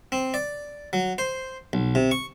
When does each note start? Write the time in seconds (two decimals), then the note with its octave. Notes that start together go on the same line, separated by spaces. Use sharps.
0.12 C4
0.34 D5
0.93 F#3
1.18 C5
1.73 B1
1.95 C3
2.11 C#6